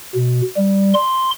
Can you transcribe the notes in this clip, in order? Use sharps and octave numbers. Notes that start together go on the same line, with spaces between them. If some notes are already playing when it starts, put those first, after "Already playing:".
B2
G3
C6